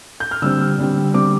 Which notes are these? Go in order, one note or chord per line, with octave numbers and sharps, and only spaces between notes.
G6
F6
D3 G3 C4 E6
D3 G3 C4
D3 G3 C4 D6